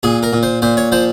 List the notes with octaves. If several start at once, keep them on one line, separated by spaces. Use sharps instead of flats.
A#2 G#4
A#4
A#2
C5
A#2 C5
C#5
F3 C5